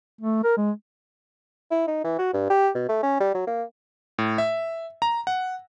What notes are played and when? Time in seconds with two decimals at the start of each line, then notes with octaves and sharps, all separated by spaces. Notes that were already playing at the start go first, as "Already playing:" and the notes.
0.21 A3
0.44 A#4
0.57 G#3
1.71 E4
1.87 D#4
2.04 E3
2.19 F#4
2.34 G2
2.50 G4
2.75 B2
2.89 A3
3.03 C#4
3.20 G3
3.35 F#3
3.47 A#3
4.18 A2
4.38 E5
5.02 A#5
5.27 F#5